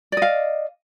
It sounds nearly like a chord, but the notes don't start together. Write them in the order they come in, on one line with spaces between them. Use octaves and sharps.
D5 D#5 F5